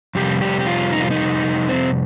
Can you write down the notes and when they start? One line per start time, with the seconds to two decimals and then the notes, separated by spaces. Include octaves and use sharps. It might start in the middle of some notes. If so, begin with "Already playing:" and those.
0.15 F2 C3 G3 G4
0.42 G4
0.60 G4
0.67 F4
0.92 D#4
1.01 F4
1.11 D#4
1.69 C4